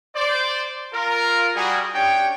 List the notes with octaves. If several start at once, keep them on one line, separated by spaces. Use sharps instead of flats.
C5 D5
F4 A#4
G3 F#4 G#4
C#4 D4 G4 C#5 G5